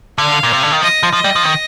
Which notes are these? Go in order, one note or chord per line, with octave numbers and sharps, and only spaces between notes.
D3 F5
A#2
C3
D3
D#3
F3 D#5
F3
F3 D#5
G3
F3
D#3